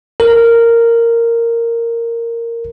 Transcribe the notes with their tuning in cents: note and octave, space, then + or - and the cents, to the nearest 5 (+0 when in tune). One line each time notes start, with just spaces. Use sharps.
A#4 -10